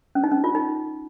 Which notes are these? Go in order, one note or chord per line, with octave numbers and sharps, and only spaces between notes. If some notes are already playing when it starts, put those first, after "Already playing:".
C#4
D#4
C#4
F4
D#4